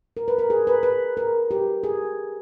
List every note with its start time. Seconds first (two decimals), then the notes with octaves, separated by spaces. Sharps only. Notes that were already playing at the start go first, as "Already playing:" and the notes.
0.17 A#4
0.28 B4
0.39 A#4
0.50 G#4
0.67 B4
0.83 B4
1.17 A#4
1.51 G4
1.83 G#4